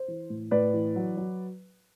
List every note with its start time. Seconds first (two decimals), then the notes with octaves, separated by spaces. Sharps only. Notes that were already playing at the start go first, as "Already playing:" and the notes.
Already playing: C5
0.08 E3
0.30 A2
0.51 A2 B4 D5
0.74 E3
0.96 F#3
1.17 F#3